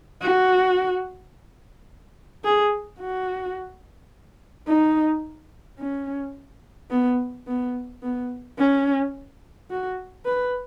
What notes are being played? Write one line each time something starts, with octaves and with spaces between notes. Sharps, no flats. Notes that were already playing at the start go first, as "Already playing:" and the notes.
F#4
G#4
F#4
D#4
C#4
B3
B3
B3
C#4
F#4
B4